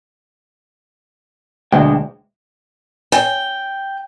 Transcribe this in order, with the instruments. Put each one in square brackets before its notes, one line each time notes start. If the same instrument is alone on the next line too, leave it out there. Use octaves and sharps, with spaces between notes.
[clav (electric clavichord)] D2 [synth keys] B2 G#3 [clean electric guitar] F#3 D4 G5
[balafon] C#5 G#5 [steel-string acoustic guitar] G5